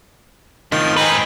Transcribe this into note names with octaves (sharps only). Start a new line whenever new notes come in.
F2 A2 D#3 F3
G#2 C4 D#4 F4 B4 G#5